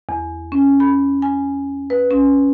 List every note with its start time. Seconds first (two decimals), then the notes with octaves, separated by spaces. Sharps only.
0.09 E2
0.52 C#4
0.80 B5
1.22 G#5
1.90 B4
2.11 C#4